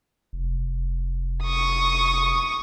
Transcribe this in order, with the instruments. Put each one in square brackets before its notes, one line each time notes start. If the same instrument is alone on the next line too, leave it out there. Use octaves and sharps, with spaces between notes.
[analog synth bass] F1
[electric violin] C#6 D#6